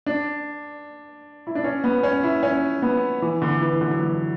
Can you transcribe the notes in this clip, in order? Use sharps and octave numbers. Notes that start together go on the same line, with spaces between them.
D4
E4
D4
C#4
B3
C#4
E4
C#4
B3
E3
D3
E3
D3
F#3
E3